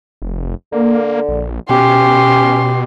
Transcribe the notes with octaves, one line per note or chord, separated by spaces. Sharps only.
F1
D3 A#3
A#1
B2 C#4 G4 C6